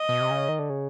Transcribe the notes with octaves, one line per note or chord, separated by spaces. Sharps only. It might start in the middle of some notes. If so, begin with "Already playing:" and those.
Already playing: D#5
B2
C3
C#3
D#3
D3
C#3